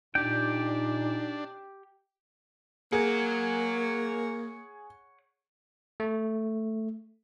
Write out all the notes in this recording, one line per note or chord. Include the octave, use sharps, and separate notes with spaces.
A#2 D4 D#4 G4 G5
A#3 G#4 C#5 F#5
A3